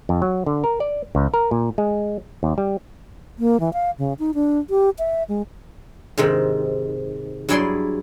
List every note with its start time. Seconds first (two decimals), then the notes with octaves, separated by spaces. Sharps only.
0.09 F2
0.22 F#3
0.46 D3
0.64 A#4
0.80 D5
1.15 C#2
1.34 A#4
1.51 A#2
1.78 G#3
2.43 D#2
2.58 G3
3.39 A#3
3.60 E3
3.73 F5
3.98 C#3
4.19 D#4
4.34 D4
4.70 G4
4.99 E5
5.29 G#3
6.18 G#2 C3 D#3
7.49 G2 F#3 E4 G#4 D5 C6